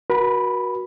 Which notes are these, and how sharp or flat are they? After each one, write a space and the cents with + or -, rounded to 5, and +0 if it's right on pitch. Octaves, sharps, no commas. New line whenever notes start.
F#4 +0 A#4 +45 B5 +0